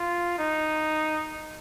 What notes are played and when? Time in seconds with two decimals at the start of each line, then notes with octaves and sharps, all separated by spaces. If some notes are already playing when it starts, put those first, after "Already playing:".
Already playing: F4
0.38 D#4